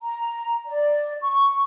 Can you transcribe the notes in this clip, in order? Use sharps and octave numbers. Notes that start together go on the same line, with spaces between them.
A#5
D5
C#6